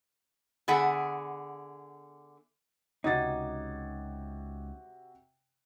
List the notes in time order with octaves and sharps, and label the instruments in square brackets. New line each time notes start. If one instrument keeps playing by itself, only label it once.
[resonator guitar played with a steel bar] D3 B3 G#4 E5 F#5
[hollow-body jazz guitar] C#2 D#4 [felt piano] C3 F#4 A6 [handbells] C#5 D6 D#6